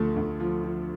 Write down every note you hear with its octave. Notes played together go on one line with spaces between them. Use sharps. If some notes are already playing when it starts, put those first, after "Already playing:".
Already playing: D2 F3 A3
D2
F3
F3